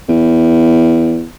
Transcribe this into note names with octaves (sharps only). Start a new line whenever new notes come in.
E2